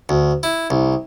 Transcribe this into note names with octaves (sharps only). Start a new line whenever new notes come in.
D2
E4
C2